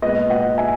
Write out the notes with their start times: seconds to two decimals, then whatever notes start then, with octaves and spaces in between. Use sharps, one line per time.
0.02 A#2 G#3 B3 B4 D#5
0.30 D#5 F#5
0.58 E5 G#5